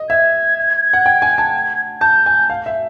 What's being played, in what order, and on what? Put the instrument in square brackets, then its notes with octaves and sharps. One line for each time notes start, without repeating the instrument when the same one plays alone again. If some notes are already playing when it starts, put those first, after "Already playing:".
Already playing: [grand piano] D#5
[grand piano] E5 [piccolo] G#6
[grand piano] F#5
G5
G#5
A5
[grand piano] A5 [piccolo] G6
[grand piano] G#5
F5
E5